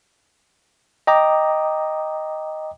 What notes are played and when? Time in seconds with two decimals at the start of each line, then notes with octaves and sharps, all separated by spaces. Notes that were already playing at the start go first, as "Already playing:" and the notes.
1.07 D#5 G5 A#5 D6 D#6